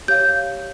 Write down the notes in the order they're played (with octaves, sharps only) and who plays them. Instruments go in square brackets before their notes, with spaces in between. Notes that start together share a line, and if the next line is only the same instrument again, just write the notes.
[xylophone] G4 C#5 F5 G6